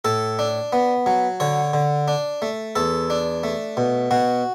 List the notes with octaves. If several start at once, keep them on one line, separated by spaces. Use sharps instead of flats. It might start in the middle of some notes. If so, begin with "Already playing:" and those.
A2 A4
D4
B3
F#3
D3 C#5
D3
D4
A3
E2 A4
D4
A3
B2
B2 F#4